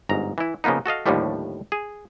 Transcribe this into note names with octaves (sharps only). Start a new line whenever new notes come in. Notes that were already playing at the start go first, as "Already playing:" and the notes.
G1 G#2 A#5
E3 E4
C#3 F3 A#3 B3 D#4
F#4 A4 D#5 F5
D#2 A2 D3 F3 G3 A3
G#4